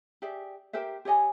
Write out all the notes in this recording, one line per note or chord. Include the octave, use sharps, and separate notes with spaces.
G4 G#4 D5 E5
G4 A#4 C5 E5
G4 C#5 D#5 G#5